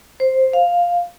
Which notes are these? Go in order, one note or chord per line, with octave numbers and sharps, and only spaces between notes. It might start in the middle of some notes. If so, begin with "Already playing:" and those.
C5
F5